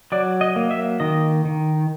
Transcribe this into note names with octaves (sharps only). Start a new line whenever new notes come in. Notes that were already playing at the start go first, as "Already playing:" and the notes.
F#3 D5
D#5
A#3
E5
D#3 D#5
D#3